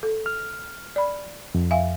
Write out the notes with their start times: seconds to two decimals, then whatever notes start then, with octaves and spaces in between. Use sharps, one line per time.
0.03 A4
0.26 F6
0.96 D5 B5
1.55 F2
1.71 E5 F5 G#5